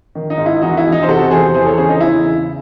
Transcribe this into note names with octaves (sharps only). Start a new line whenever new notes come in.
D#3
D#4
G#2
E4
E2 D#4 F#4
E4
E2
D#4
C5
C3 F#4 A4
E2 G#4 C5
E3 G#4 C5
A4 C#5
C#3 G#4 C5
D#4
E2 E4
C#3